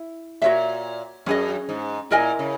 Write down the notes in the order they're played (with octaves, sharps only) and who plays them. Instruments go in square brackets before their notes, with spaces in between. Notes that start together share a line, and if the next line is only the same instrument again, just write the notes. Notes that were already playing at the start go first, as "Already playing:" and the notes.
Already playing: [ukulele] E4
[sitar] A#2 [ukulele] F#4 C#5 E5
[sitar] F#2 [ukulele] C#4 G#4 D#5
[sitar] G#2
[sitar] A#2 [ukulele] E4 A#4 D#5 G#5
[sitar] C#3